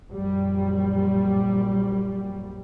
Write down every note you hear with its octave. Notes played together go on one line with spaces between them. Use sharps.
A#1 F#2 G3